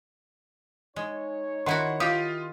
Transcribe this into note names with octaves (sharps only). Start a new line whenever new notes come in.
G#3 D#4 C#5
D#3 E4 F#4 F#5 C6
F4 G4 F5 D#6